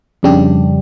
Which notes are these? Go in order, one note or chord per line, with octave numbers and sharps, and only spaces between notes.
F2 C#3 G3 D4 G4